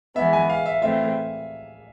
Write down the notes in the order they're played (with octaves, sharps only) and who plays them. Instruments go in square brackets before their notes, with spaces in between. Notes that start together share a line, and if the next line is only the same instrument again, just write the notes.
[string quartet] E3 G#3 B3 [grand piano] E5
[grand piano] G#5
F5
E5
[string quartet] E3 A3 C4 F4 [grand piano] E5